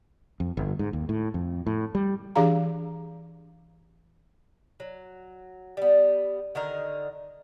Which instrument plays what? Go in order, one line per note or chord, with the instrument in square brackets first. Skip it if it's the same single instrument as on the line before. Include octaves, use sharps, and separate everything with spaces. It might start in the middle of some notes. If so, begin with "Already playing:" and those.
[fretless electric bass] F2
G1
G#2
D#2
A2
F2
A2
G3
[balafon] E3 D4 G4 G#4 F5 A#5
[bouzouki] F#3
G3 B3
D3 D#3 D#4 A#4